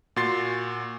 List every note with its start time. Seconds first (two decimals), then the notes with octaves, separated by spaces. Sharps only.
0.16 A#2 F#4 C6 A6 C7